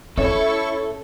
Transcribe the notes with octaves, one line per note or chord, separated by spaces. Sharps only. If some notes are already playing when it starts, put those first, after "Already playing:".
C#4 E4 A4 C#5 E5 C#6